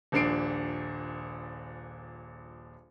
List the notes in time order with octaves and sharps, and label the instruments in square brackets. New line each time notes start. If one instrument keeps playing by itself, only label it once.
[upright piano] D#1 A#1 D4 C7 D7